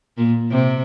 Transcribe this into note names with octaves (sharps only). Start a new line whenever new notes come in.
A#2
C3